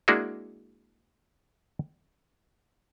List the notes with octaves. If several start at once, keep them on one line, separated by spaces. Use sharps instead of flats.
G#3 A#3 D4 E4 F#4 G#4